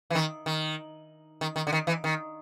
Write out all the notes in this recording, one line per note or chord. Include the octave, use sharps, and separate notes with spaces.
E3
D#3
D#3
D#3
D#3
D3
D#3
E3
D#3